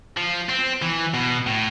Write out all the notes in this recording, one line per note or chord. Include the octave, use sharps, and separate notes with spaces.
F3
C4
E3
B2
A2